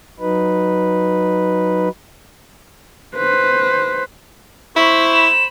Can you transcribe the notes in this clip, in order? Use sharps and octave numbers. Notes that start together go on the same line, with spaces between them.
F#3 D#4 B4
B4 C5
E4 C5 B5 C#6
E7